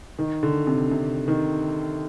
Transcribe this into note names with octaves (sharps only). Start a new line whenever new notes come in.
D#3
D3
C3
C3
D#3